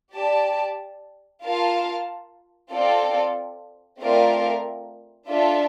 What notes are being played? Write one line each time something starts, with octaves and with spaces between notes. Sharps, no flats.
G4 D5 A5
F4 A#4 F5 A5
C4 F4 A4 D5
A3 C4 F4 A#4 D5
D4 F4 A4 E5